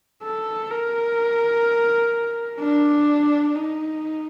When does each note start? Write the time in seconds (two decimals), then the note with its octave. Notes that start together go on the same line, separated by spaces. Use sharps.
0.23 A4
0.71 A#4
2.60 D4
3.56 D#4